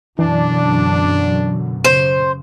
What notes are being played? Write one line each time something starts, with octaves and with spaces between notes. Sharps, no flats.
F#2 B2 D3 E3 D4
C#3 C5